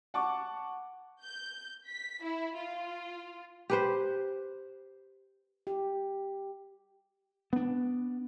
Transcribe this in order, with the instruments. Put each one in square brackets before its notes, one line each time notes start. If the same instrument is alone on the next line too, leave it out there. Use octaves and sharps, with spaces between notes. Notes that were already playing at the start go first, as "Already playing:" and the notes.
[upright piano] F#5 A5 C#6 D6
[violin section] G6
B6
E4
F4
[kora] G4 B4 C5
[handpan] G4
[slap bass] B3 D4